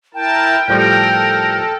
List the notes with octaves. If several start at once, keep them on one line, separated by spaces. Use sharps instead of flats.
E4 A#4 G5 A5
A2 F3 G3 A4 A#4